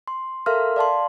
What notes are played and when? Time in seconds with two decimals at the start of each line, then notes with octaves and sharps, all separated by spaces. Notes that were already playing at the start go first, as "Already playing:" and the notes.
0.08 C6
0.46 A4 A#4 E5 F5 C6 F6
0.76 D5 F5 A5 C6